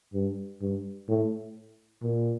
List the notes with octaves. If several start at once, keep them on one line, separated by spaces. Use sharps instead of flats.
G2
G2
A2
A#2